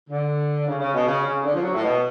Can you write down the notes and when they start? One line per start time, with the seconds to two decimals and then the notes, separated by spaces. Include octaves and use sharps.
0.09 D3
0.67 C#3
0.80 C#3
0.94 B2
1.06 C#3
1.25 C#3
1.44 D3
1.53 F3
1.63 F#3
1.74 A2
1.82 B2